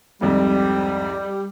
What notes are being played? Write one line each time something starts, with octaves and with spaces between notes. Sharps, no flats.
C2 F2 G#2 G3